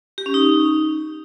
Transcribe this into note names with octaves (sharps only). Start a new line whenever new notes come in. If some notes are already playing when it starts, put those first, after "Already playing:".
G4
C#4
D#4